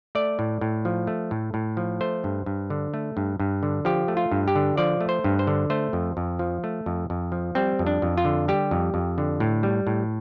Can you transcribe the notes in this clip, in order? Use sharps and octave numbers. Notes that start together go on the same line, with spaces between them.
A3 D5
A2
A2
F3
A3
A2
A2
F3
A3 C5
G2
G2
D3
A3
G2
G2
D3
F3 G4
A3
F4
G2
G4
D3
F3 D5
A3
C5
G2
C5
D3
A3 C5
F2
F2
F3
A3
F2
F2
F3
G3 C4
F2
D4
F2
F4
D3
G3 G4
F2
F2
D3
A2
G3
A2